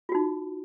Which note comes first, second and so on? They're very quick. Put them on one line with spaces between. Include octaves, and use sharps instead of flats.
F4 F#4 D#4